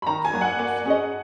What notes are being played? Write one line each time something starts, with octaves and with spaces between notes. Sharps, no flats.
B5
D#3 A#5
G#5
F#3 A#3
F#5
A#3
C#4 G#4 D#5